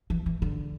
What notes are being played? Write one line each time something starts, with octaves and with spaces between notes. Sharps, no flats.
E3
E3
D3